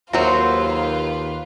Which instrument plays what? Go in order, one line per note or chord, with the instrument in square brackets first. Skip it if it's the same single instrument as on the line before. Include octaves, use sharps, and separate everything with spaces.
[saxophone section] D#2 [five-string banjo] F#3 F#4 [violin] F4 B4 [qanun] C5 E5